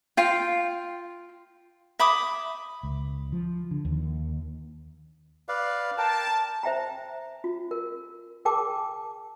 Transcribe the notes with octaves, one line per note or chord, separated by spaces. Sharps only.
F4 G5
E5 B5 D6 D#6
C#2
F3
D3
D#2
B4 D5 F5
A#4 G5 A5
C5 E5 G5 A#5
F4
A#4
G#4 A#4 G5 A5 D6